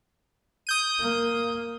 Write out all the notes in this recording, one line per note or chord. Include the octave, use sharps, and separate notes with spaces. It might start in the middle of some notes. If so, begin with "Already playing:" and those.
D#6 G6 D#7
A#3